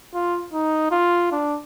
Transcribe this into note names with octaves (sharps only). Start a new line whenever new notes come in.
F4
D#4
F4
D4